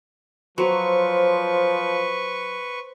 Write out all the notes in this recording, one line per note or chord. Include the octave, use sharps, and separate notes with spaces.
F3 F#3 B4 C5 C#6